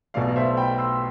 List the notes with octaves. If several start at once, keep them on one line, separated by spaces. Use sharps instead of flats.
B1 B2 A3 D5 F5
C5 E5
G5 B5
C6 E6